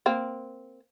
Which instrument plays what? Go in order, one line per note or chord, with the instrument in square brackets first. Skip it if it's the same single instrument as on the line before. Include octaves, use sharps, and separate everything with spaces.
[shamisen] A#3 C4